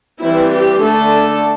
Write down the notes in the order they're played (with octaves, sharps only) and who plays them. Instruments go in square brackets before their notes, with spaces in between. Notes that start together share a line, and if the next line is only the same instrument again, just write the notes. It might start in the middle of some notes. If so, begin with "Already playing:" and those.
[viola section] E3 G3 C4 E4
G4
D3 A3 D4 A4